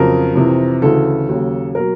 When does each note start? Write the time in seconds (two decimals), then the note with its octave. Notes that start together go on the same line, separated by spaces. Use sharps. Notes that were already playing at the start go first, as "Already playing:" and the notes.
Already playing: F2 C#3 F#3 A#4
0.35 F2 C3 E3
0.82 D2 C#3 E3 A4
1.29 D#2 C#3 F#3
1.75 B2 F#3 A#4